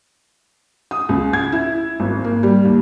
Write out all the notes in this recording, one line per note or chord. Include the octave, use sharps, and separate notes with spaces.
D#6
C#2
G#6
E4
G#1
A#3
G3
D#2